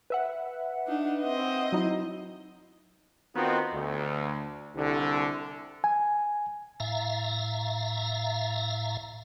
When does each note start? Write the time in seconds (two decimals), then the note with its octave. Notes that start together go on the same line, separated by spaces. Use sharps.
0.10 B4 E5 F#5
0.87 D4 D#4
1.23 C4 D#5
1.72 F#3 D#4 E4
3.36 D#3 B3 C4 D#4 F4 F#4
3.74 D2
4.76 C2 D3
5.84 G#5
6.80 A2 E5 F5 A#5